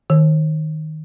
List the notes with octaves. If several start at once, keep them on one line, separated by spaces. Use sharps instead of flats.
D#3